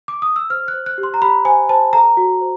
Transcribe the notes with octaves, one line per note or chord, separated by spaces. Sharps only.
D6
D#6
E6
C5 F6
F#6
C5
F#6
G4
C6
A#5
G4 B5
C5 G#5
C5 A5
A4 A#5
F#4
C5